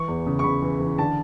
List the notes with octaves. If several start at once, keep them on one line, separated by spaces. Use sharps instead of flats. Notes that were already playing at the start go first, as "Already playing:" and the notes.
Already playing: E3 C#6
E2
C#3
C#6
C#3 B5
E3
E3
D3 A5